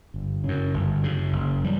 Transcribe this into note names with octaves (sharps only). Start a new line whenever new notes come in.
G1
F#2 C#3
G1
F#2 C#3
F#1
E3 G3